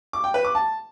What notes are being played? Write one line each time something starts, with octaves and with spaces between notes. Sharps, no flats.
D6
G5
B4
D6
A5